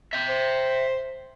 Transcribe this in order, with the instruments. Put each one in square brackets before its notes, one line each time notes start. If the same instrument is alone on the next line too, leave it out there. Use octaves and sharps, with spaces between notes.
[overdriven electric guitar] E5 G5
[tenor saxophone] C5